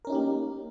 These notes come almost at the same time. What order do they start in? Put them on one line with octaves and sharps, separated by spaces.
A#4 C#4 D#4 G4 A#3